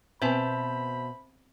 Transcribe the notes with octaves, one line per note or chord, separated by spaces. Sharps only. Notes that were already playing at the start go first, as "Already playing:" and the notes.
B2 B3 C4 B4 C5 E5 A5 B5